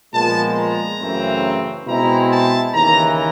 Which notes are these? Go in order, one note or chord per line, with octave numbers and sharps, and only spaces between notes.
A#2 F3 G#3 B3 A5
A#5
F#2 C#3 E3 A3 C4
B2 G#3 C4 E4 A#5
A5
D#2 C#3 E3 A#5